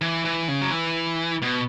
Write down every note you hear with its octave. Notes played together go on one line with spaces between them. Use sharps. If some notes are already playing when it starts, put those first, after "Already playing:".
E3
E3
C#3
F#3
E3
B2